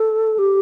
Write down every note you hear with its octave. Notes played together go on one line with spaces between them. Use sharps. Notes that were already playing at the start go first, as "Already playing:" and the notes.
Already playing: A4
G4